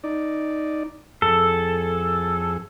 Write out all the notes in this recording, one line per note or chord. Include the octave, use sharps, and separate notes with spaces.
D#4 D5
F2 G#4 A4